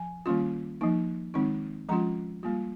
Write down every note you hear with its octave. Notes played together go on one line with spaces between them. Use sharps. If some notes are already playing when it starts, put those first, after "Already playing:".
Already playing: F3 G#5
D#3 G3 A#3 C#4 F4
F3 A#3 D#4
D#3 G#3 C4 D#4
F3 G#3 C#4 F4 A#5
G3 A#3 F4